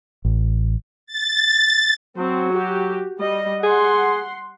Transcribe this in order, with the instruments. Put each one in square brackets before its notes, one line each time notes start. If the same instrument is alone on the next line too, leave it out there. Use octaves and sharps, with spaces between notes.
[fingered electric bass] A1
[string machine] A6
[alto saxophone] F#3 [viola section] C4
[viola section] F#4 G4
G3 D#5
[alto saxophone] G#4 [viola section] F#5 C6